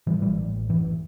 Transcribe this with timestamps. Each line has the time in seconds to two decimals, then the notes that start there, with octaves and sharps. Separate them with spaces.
0.07 A2 E3 G3
0.22 A1 E3 G3
0.38 A2
0.54 A1
0.69 F#2 E3